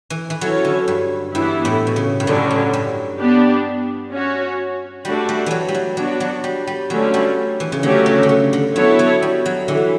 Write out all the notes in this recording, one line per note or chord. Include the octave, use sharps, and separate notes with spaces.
E3
E3
F#3 C#4 E4 A4 C#5
D3
G2
G2 E3 B3 E4
A2
B2
C#3
G2
A2 D3 F#3 C#4
A2
G2
B3 D4 G4
C#4 F#4 C#5
G3 A3 D4 F#4
G3
E3 F#3
G3
F#3
F#3 B3 D4 F#4
F#3
G3
G3
D3 F#3 A3 C#4
G3
E3
C#3
D3 F#3 A3 C#4 G4
C#3
D3
C#3
D3
F#3 B3 E4 A4 C#5
F#3
G3
F#3
D3 E3